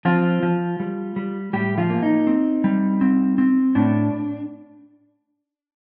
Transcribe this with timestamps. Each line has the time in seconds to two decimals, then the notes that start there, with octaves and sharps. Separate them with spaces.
0.05 F3 C4 F4
0.43 F3
0.80 G3
1.16 G3
1.53 A2 G3 G4
1.78 F3 F4
1.90 A#3
2.03 D#4
2.27 C4
2.64 G3
3.01 C4
3.38 C4
3.75 A2 D4